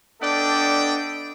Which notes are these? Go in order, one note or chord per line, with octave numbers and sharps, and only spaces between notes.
B3 D4 A4 D5 D#5 G5